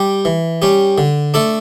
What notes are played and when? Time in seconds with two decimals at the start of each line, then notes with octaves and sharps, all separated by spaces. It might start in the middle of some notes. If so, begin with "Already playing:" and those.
Already playing: G3 G4
0.25 E3
0.62 G3 C#4 G4
0.98 D3
1.34 A3 D4 A4